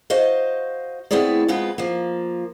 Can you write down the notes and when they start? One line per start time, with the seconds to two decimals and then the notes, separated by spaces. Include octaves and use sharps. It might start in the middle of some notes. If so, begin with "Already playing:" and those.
0.10 F#4 C5 D#5 F5
1.11 A3 B3 C4 E4 G#4 D5
1.48 F2 G#3 B3 F4 B4
1.78 F3 A#3